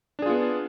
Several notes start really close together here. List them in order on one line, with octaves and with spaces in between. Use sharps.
D4 G#4 F4 B3